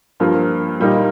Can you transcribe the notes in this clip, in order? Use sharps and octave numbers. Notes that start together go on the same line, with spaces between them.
G2 F3 A#3
A#2 G3 A#3 D#4